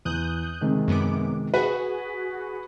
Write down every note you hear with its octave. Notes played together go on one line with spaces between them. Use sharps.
E2 D#6 F#6 G6
C3 D#3 G#3
F#2 B3 D6
F#4 G#4 B4